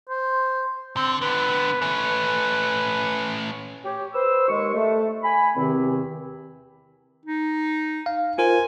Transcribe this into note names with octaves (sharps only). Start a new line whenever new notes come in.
C5
D3 C4
D3 B3 B4
A3 C#4 B4
G4 C#5
B4 C5 E6
D#2 G#3 C#6
A3
G#5 B5
E2 C3 D#3 C4
D#4
F5
F4 A#4 C5 G#5